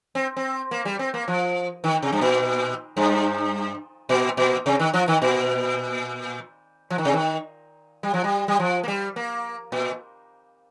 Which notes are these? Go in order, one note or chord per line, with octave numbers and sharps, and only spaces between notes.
C4
C4
A#3
G3
C4
A#3
F3
D#3
C3
G2
A#2
G2
A#2
A#2
C3
D#3
F3
D#3
A#2
F3
D#3
C3
D#3
G3
F3
G3
G3
F3
A#3
G3
A#3
A#2